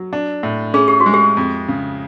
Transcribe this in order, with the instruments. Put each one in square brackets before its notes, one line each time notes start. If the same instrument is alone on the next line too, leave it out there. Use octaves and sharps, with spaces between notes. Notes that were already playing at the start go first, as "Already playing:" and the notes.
Already playing: [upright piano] F#3
D4
A2
[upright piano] C#4 [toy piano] G#4
[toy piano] G4
F#4
[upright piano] G#3
[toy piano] G4
[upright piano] F2
C#3